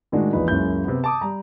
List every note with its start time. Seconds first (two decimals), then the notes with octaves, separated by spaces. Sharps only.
0.12 A2 D#3 G#3 D4 F#4
0.33 A#1 E2 A#2 E3 D#4 B4
0.48 C#2 F#2 C#3 A#3 E4 G6
0.84 C3 B3
1.04 A5 D6 D#6
1.21 G3 A#5